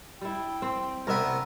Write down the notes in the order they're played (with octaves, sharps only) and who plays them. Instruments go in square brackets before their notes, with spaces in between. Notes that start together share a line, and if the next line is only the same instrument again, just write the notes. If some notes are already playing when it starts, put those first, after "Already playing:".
[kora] G3 E4 [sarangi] G5
[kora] C4
[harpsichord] C2 B3 [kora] A#4 E5